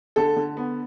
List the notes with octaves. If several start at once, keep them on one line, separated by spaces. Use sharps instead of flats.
D3 A4
D3
B3